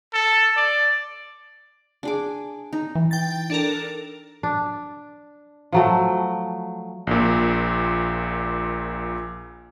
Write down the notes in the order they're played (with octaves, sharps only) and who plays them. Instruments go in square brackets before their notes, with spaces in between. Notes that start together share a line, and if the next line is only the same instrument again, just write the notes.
[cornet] A4
D5
[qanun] D4 G#4 D6
D#4
[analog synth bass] E3
[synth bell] G5 A6
D4 A4 A#4
[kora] D4
F3 F#3 A3
[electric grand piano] A#1 A#2